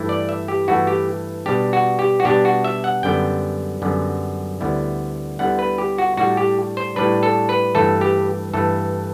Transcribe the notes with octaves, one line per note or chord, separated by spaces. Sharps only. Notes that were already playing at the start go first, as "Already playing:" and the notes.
Already playing: G2 E3 A3 E4
D5
E5
G4
G2 E3 A3 E4 F#4
G4
B2 G3 D4 G4
F#4
G4
F#4
B2 G3 D4 G4
F#4
E5
F#5
F#2 D3 G3 B3 G5
F#2 D3 G3 B3
D2 D3 G3 B3 E4
D2 D3 G3 B3 E4 F#5
B4
G4
F#4
A2 G3 D4 F#4
G4
C5
A2 G3 D4 B4
A4
B4
G2 E3 A3 A4
G4
G2 E3 A3 A4